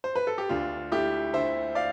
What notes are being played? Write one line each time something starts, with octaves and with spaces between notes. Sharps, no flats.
C5
B4
A4
G4
D2 D4 F4
A3 E4 G4
D3 C5 E5
D5 F5